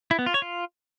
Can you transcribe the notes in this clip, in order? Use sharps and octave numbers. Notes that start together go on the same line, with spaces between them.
E4
B3
F4
C#5
F4